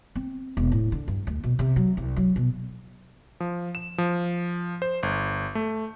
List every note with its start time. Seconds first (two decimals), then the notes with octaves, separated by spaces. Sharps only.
0.15 C4
0.57 E1
0.72 A2
0.92 D3
1.08 G2
1.27 D2
1.44 B2
1.59 C3
1.76 F#3
1.97 C2
2.17 F#3
2.36 B2
3.40 F3
3.75 E7
3.98 F3
4.82 C5
5.03 G1
5.55 A3